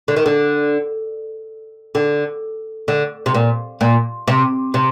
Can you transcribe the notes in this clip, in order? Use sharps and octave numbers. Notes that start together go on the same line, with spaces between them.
D3
D#3
D3
D3
D3
C3
A#2
A#2
C3
C3